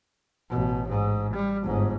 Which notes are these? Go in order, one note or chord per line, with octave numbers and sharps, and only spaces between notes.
A1 B2
G#2
G3
G1 G#2